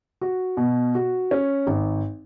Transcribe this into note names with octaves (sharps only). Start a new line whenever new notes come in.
F#4
B2
F#4
C#4
G#1